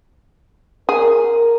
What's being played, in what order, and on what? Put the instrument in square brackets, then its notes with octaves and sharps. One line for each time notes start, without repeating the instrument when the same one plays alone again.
[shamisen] G#4 [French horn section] A#4